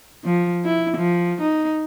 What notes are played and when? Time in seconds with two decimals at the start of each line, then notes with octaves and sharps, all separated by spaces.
0.25 F3
0.65 E4
0.97 F3
1.41 D#4